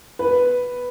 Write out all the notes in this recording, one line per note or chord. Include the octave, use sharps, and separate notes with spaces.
B4